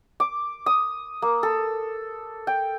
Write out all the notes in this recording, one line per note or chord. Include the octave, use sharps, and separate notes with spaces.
D6
D#6
A#3
A4
G5